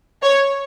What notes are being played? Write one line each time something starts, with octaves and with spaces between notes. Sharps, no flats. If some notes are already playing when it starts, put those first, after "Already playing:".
C#5